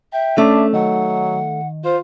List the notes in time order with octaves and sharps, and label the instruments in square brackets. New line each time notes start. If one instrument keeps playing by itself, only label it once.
[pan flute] E5 [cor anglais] G5
[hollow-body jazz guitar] A3 [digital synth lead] C#4 [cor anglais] D4
[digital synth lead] D#3 [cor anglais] F#3 [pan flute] F#5
[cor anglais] F4 [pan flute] C5